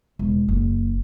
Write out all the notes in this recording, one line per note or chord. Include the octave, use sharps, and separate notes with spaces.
E1
F#1